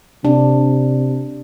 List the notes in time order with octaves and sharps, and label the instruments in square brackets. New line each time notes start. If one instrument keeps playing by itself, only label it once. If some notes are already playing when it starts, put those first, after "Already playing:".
[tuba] C3 [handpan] D4